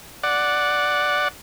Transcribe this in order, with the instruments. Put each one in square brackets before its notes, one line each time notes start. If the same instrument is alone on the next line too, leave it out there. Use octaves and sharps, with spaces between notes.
[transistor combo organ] D5 F#5